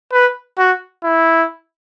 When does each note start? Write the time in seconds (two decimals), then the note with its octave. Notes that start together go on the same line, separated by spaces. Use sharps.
0.12 B4
0.58 F#4
1.04 E4